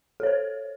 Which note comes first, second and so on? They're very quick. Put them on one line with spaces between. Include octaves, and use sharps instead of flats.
A4 C#5 C5